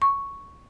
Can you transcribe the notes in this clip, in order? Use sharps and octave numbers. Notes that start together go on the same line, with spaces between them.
C#6